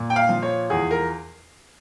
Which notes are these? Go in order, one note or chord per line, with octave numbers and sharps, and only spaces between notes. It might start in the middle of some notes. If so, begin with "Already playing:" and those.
Already playing: A#2
G5
F5
F3
C#5
E2 G#4
A#4